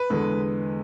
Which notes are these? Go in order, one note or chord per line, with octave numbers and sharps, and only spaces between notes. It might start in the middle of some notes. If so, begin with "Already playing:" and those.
Already playing: B4
E2 D3 G#3 B3